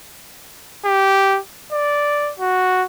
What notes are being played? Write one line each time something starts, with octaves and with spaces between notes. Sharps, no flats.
G4
D5
F#4